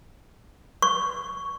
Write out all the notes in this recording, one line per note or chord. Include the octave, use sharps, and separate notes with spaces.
C#6